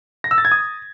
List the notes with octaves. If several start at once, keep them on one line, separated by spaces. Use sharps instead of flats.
A#6
E6
A6
G#6
D#6